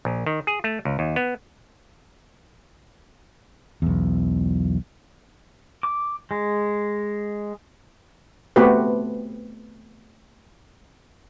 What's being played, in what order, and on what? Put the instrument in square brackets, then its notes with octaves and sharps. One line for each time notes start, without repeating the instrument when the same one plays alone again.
[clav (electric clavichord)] A#1
D#3
G#4
A3
C#2
D#2
B3
[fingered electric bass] B1 E2
[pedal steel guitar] D6
G#3
[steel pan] A3 B3 C4 F#4 G4 B4